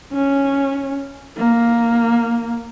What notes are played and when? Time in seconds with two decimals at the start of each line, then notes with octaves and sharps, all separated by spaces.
0.12 C#4
1.37 A#3